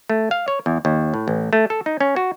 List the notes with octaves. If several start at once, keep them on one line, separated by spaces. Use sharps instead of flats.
A3
F5
C#5
E2
D#2
A2
A1
A3
A4
D#4
C#4
F#4